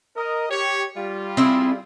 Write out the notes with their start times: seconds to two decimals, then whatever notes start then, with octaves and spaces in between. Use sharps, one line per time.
0.16 A#4 D#5
0.49 G4 C#5
0.95 G3 F4
1.37 C4 E4 G#4